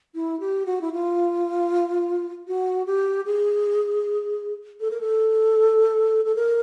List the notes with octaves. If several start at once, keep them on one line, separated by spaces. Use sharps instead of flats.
E4
G4
F#4
E4
F4
F#4
G4
G#4
A4
A#4
A4
A4
A#4